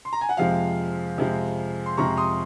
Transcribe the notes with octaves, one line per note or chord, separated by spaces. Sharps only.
C6
A#5
G#5
F#5
F2 C3 F3 G#3 F5
F2 C3 F3 G#3
C6
F2 C3 F3 G#3 A#5 C#6
C6 D#6